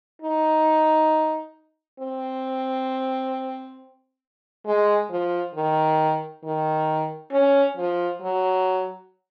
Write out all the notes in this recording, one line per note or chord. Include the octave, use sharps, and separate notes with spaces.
D#4
C4
G#3
F3
D#3
D#3
C#4
F3
F#3